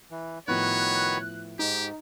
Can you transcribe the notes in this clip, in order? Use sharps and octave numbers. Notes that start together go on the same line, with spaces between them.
E3
A2 D#3 F3 B3 F#4 B4 C#5 F#6
G#2 D#4 G4